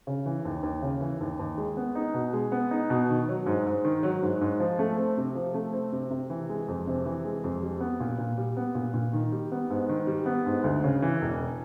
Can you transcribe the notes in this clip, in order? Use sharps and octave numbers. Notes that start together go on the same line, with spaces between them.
C#3
E3
D#2
D#2
C#3
E3
D#2
D#2
G#3
B3
D#4
B2
G#3
B3
D#4
B2
D#3
F#3
G#2
G#2
D#3
F#3
G#2
G#2
F3
A3
C4
C3
F3
A3
C4
C3
C3
E3
G#3
F2
C3
E3
G#3
F2
G3
B3
A#2
A#2
G3
B3
A#2
A#2
D#3
G3
B3
G#2
D#3
G3
B3
G#2
D2
C#3
E3
E1